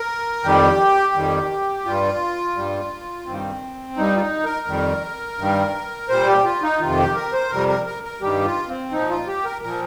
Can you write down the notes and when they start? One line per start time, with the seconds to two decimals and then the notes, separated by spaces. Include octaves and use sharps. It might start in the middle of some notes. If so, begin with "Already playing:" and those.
Already playing: A#4
0.44 F2 D#3 G3 G4
1.14 F2 D#3 G3
1.85 G2 G3 F4
2.56 G2 G3
3.26 G2 D#3 G3 C4
3.96 G2 G3 D#4
4.15 F4
4.20 D#4
4.45 A#4
4.68 F2 D#3 G3
5.38 G2 D#3 G3
6.09 A#2 G3 C5
6.27 G4
6.44 F4
6.62 D#4
6.79 F2 C3 D#3 F4
6.98 G4
7.15 A#4
7.33 C5
7.50 F2 C3 G3 A#4
7.68 A#4
7.86 A#4
8.03 A#4
8.21 G2 D#3 G3 G4
8.45 F4
8.68 C4
8.92 A#2 F3 D#4
9.09 F4
9.27 G4
9.45 A#4
9.62 A#2 F3 A#4